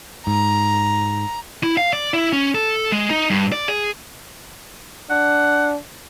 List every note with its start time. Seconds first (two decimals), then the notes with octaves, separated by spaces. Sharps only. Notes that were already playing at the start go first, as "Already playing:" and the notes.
0.27 G#2 A#5
1.63 E4
1.77 F5
1.93 D5
2.14 E4
2.33 C#4
2.55 A4
2.92 G#3
3.10 D#4
3.30 G2
3.52 D5
3.68 G#4
5.10 D4 F#5